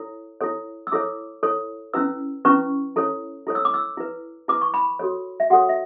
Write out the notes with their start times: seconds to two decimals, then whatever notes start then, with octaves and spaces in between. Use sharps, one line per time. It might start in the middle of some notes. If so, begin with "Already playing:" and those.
Already playing: E4 A4 C#5
0.41 E4 A4 C#5
0.87 E6
0.92 E4 A4 C#5 D6
1.43 E4 A4 C#5
1.94 C#4 E4 B4 E6
2.45 C#4 E4 B4 C#6
2.96 E4 A4 C#5
3.47 E4 A4 C#5
3.55 E6
3.65 D6
3.74 E6
3.97 E4 B4
4.48 E4 B4 D6
4.61 C#6
4.74 B5
4.99 F#4 A4 C#5
5.40 E5
5.50 F#4 A4 C#5 F#5
5.69 E5